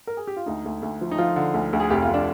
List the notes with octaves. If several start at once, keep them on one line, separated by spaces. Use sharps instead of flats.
A#4
G#4
G4
F4
D2 D#4
D2
D2
F3
D#4
F3 F4
D3
D2
D2
G#4
F1 G4
F4
F1
D4